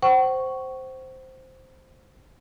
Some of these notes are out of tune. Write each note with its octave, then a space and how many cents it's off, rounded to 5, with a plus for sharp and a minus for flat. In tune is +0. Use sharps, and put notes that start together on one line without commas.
C5 +0 F#5 +45 C#6 +0